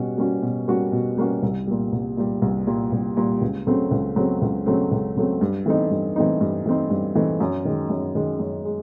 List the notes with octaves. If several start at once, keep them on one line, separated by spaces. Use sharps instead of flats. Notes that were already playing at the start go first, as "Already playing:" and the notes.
Already playing: B2 G3 C#4 F#4
G3 A#3 C#4 F#4
B2
G3 A#3 C#4 F#4
B2
G3 A#3 C#4 F#4
C2
A#2 G3
C2
A#2 G3
C2
A#2 G3
C2
A#2 G3
C#2
C#3 F#3 A3 C4
C#2
C#3 F#3 A3 C4
C#2
C#3 F#3 A3 C4
C#2
C#3 F#3 A3 C4
G2
E3 A3 C4 D#4
G2
E3 A3 C4 D#4
G2
E3 A3 C4 D#4
G2
E3 A3 C4 D#4
F#2
D#3 G#3
F#2
D#3 G#3
F#2
G#3